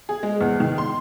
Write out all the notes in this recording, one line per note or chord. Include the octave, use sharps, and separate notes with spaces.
G#4
G#3
E2
D#3
C6